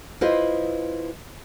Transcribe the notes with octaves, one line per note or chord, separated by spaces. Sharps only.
E4 F4 B4 C5 D#5